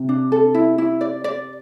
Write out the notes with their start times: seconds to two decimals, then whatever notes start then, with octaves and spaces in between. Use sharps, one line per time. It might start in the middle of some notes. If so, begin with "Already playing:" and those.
Already playing: C3
0.09 D4
0.32 A4
0.55 E4
0.78 E4
1.01 D5
1.24 D5